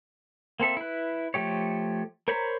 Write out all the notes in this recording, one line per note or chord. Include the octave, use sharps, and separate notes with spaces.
A#3 C4 A4 E5
E4 B4
F3 A3 G4 C#5
A#4 C5 C#5 A#5 B5